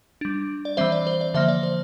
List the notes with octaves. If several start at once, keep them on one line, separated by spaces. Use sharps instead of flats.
G3 D4
D5
E3 G3 C4 C5 E5
D5
C5
D5
D3 F3 A#3 C5 E5
D5
C5